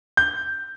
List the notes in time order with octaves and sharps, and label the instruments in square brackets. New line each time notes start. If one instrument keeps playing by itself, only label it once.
[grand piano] G6